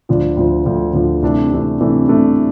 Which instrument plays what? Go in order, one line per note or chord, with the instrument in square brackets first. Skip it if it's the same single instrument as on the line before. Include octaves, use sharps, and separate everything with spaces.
[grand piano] D2 D3 F3
D2 D3 F3
D2 D3 F3
D2 D3 F3
C2 C3 E3 A3 D4
C2 C3 E3 A3 D4
C2 C3 E3 A3 D4
C2 C3 E3 A3 D4